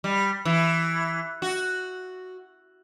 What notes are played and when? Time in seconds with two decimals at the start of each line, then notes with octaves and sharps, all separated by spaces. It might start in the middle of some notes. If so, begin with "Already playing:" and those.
0.04 G3
0.45 E3
1.42 F#4